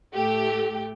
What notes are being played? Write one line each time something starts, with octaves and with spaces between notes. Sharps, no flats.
A2 A3 G4